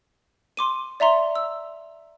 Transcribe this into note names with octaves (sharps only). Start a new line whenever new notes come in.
C6 D6 D#7
D5 E5 A#5 C6
E6